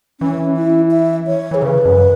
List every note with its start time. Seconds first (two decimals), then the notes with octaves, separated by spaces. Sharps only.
0.20 E3 C#4
0.57 E4
0.91 E5
1.27 C#5
1.51 E3 G#4
1.62 C#3 B4
1.85 F#2